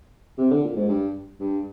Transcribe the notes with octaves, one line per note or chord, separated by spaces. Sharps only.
C3
D3
A#2
G#2
G2
G2